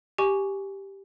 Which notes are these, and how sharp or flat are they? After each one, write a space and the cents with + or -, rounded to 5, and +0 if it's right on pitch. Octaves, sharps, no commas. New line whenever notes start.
G4 +0 G#5 +5 C#6 +10